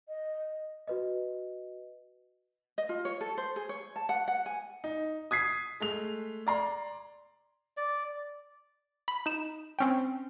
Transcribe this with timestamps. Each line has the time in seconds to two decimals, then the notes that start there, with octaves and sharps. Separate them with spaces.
0.08 D#5
0.87 F#4 B4 D#5
2.78 D#5
2.89 F4
3.05 C#5
3.21 A4
3.38 C5
3.56 G#4
3.69 C#5
3.96 A5
4.09 F#5
4.28 F#5
4.46 G#5
4.84 D#4
5.31 D#6 G#6 B6 C7
5.80 G#3 A3 F7
6.47 D5 A#5 C6
7.77 D5
9.08 B5
9.26 D#4 E7
9.79 C4 C#4 G5